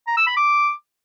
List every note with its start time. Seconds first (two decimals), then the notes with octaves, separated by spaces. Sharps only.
0.07 A#5
0.17 E6
0.27 B5
0.37 D6